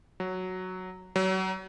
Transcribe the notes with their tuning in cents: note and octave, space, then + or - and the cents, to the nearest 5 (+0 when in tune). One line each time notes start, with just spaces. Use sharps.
F#3 +0
F#3 +30